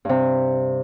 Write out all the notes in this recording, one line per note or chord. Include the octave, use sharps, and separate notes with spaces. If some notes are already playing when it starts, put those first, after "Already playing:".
G2 C3